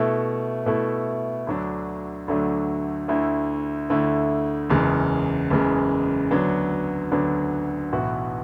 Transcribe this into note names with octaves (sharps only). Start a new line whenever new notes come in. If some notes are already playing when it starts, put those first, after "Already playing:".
Already playing: B2 A3 E4 A4
B2 A3 E4 A4
D2 D3 F#3 A3 D4
D2 D3 F#3 A3 D4
D2 D3 A3 E4
D2 D3 A3 E4
F#1 E2 C#3 G#3
F#1 E2 C#3 G#3
D2 D3 F#3 B3 D4
D2 D3 F#3 B3 D4
B1 A2 E3 B3 F#4